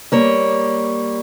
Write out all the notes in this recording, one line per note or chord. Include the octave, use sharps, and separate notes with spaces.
G3 A#3 C#5